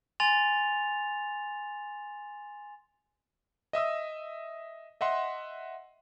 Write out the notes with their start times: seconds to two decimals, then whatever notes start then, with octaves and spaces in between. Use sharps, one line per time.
0.20 G#5 C6 A6 F7
3.73 D#5 E5 D#6 E6
5.01 D#5 E5 F#5 C6